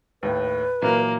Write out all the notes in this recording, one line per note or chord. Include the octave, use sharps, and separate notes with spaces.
D#2 A2 B4
A#2 E3 F#3 A#3